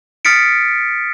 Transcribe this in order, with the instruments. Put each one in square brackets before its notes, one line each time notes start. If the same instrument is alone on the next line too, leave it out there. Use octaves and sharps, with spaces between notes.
[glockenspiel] D#6 F6 A6 B6 C#7 D7